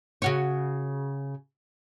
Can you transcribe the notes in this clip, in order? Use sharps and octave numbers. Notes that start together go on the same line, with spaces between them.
C#3 F#4 C#5